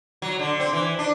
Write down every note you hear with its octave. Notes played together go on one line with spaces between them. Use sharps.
F#3
D3
C4
E3
D4